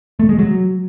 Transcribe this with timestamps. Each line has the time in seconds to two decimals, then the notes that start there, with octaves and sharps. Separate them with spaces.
0.19 A3
0.29 G#3
0.39 F#3